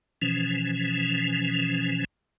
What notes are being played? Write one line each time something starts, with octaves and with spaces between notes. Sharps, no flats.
B2 E3 F3 C#4